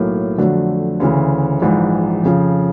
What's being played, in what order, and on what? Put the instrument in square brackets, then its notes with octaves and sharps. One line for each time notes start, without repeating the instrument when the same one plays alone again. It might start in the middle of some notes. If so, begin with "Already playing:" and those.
Already playing: [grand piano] B1 A2 F#3 A#3
F2 D3 F#3 A3
D2 C#3 E3
A#1 G#2 E3
F2 C#3 F3